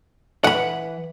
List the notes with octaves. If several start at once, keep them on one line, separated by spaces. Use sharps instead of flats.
E3 B4 F#5 B5